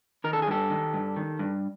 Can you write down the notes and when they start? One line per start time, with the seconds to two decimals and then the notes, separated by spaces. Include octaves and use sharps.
0.24 D#3 A#4
0.33 A4
0.42 G#4
0.47 G2 G4 A4
0.70 D#3
0.94 G2
1.16 D#3
1.39 G2